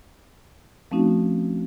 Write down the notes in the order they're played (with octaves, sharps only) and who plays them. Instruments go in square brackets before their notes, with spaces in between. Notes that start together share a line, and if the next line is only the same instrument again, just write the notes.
[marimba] F3 A3 C4 C#4 D#4 F#4